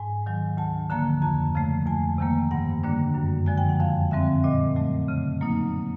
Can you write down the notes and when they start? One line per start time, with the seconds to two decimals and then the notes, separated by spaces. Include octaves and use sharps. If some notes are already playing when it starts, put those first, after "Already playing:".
Already playing: G#2 G#5
0.26 D#3 F#3
0.57 D2 A5
0.90 D3 F3 A#3 A#5
1.22 F2 A5
1.55 C#3 F3 A3
1.86 F2 G#5
2.18 C3 D#3 G3 A#3
2.51 G2 F#5
2.83 D3 G3 A#3 D4
3.15 F#2
3.46 D3 F3 G#3 G#5
3.58 G5
3.69 F#5
3.79 F2 F5
4.11 D3 G3 C4 E5
4.44 A#2 D#5
4.76 F#3 A3
5.08 C#3
5.41 F#3 A#3 D#4